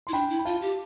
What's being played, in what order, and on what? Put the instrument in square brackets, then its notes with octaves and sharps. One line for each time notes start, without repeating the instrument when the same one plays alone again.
[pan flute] E4 [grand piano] C6
[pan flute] D4 [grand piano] G5 B5
[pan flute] E4
[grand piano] B5
[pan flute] F4 [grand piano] F5 A5
[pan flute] G4